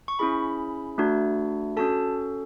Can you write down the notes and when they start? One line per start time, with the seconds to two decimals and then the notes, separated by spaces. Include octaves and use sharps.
0.08 C#6
0.19 C#4 E4 G#4 B5
0.98 A3 D4 F#4
1.77 C#4 F#4 A4 A5